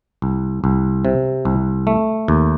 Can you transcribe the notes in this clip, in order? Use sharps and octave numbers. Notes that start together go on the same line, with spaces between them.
C2
C2
C3
C2
A3
D#2